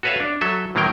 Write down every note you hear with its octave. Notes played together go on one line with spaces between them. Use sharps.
F#4 A4 B4 C#5 E5 F5
D4
F#3 A4 E5
A2 D#3 F#3 A#3 A#4 G5